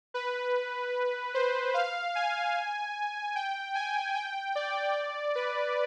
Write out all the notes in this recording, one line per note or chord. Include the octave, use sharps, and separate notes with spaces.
B4
C5
F5
G#5
G5
G#5
G5
D5
B4